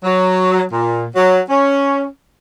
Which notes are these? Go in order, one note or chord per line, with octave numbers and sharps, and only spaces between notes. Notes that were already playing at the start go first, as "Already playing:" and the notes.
F#3
A#2
F#3
C#4